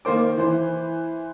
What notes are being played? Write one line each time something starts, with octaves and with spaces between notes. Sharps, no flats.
D#3 A#3 C5 D6
E3 C5